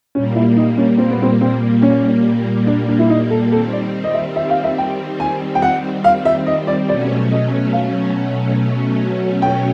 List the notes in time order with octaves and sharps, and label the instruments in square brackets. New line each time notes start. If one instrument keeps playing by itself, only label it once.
[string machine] A#2 G3 A#3 [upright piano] C#4
[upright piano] E4
D#4
C#4
C4
B3
C4
C4
C#4
D4
D4
E4
D#4
A4
[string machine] D#3 G3 C4 [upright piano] A4
[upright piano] D5
D#5
E5
E5
F5
E5
G5
G#5
G5
F#5
F5
E5
D#5
D5
[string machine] B2 F#3 A3 C#4 [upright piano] D5
[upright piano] D#5
F5
G5